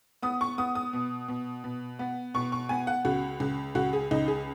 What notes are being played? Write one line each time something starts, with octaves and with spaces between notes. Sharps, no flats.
B3 D#6
C#6
B3 D#6
D#6
B2
B2
B2
B3
B2 C#6
C#6
B3 G#5
F#5
C#2 F#4
C#2
C#2 F#4
G#4
C#2 D#4
G#4